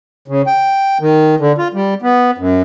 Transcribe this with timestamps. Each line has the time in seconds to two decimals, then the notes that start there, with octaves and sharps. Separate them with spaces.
0.28 C#3
0.47 G5
1.00 D#3
1.40 D3
1.58 F4
1.74 G3
2.02 B3
2.38 F#2